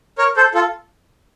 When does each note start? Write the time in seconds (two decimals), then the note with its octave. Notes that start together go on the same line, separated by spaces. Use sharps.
0.18 A#4 C#5
0.37 A4 C5
0.54 F4 A4